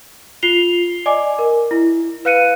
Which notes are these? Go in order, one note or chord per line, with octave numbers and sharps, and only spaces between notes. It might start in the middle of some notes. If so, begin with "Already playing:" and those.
F4 C7 F7 G7
D5 D#5 G#5 D6
A#4
E4
B4 F5 F#6 C#7 D#7